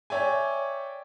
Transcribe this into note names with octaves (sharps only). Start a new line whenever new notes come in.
C#5 D5 E5 G5 G#5